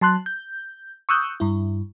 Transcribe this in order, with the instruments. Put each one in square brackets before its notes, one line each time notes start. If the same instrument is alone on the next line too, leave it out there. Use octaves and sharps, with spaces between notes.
[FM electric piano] F#3 A5 C6 F#6
G6
C#6 D#6 E6 F#6 G6
G2 E4